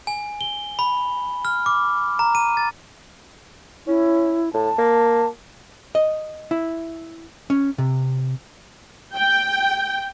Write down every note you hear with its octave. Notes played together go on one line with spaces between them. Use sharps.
G#5
G7
B5
F6
D6
A#5
D#7
A6
C#4 E4
A2 A5
A#3
D#5
E4
C#4
C3
G5